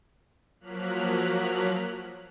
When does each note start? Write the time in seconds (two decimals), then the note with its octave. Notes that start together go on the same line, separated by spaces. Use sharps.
0.60 F3 F#3 A#3 F6 F#6 B6